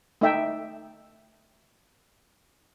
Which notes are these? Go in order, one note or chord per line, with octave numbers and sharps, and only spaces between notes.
A3 D#4 E5 G5